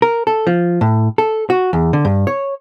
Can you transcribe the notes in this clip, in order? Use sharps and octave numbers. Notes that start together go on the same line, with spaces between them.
A#4
A4
F3
A2
A4
F#4
E2
D3
G2
C#5